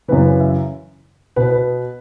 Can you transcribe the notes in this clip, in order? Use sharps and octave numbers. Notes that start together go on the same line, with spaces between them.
F#2 C#3 E3 B4
B4
E5
B2 B3 B4
B4